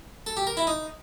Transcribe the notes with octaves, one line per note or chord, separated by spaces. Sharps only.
A4
G4
A#4
E4
D#4